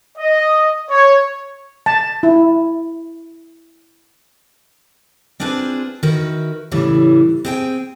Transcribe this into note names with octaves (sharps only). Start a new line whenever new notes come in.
D#5
C#5
A5
E4
C4 D4 F4 G#4 B4 C5
D#3 F#4 A#4 B4 E5
A2 C#3 E3 G3
C4 G#4 D#5 F5 G5 G#5